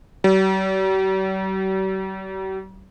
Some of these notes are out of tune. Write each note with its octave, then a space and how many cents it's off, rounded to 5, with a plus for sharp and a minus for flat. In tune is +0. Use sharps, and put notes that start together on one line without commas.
G3 -45